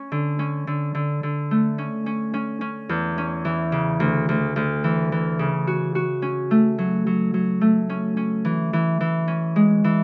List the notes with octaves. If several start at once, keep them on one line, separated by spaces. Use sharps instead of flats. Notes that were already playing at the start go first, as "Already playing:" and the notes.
Already playing: C#4
D3
C#4
D3
D3
D3
A3
C#4
C#4
C#4
C#4
E2
C#4
E3
C#3
D2
D2
D2
E3
E3
C#3
F#4
F#4
C#4
A3
F#3
F#3
F#3
A3
C#4
C#4
E3
E3
E3
C#4
G#3
E3